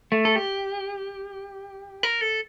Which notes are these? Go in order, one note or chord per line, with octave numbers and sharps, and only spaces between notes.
A3
A4
G4
A#4
A4